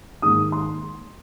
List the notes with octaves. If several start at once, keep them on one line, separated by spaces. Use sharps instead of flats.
G#2 D#3 A#3 D#6
C6